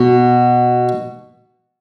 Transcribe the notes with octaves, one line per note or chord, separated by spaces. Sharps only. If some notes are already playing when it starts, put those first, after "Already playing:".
Already playing: B2